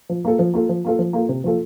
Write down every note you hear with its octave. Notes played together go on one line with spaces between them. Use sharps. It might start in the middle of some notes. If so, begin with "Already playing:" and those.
F3
A#3 F4 A4
F3
A#3 F4 A4
F3
A#3 F4 A4
F3
A#3 F4 A4
C3
F3 A#3 F4 A4